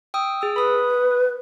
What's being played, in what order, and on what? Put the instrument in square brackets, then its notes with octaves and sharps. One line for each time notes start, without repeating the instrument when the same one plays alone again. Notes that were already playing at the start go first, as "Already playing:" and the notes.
[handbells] G5 D#6 E6
G#4 D#6 E6
[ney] B4 [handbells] B5 D#6